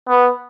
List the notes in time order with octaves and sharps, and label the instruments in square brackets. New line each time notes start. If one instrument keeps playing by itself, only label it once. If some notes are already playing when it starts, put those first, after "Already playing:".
[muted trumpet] B3